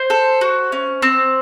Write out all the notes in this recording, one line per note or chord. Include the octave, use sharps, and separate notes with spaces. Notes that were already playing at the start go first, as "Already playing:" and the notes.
Already playing: C5
A4
F#4
C#4
C4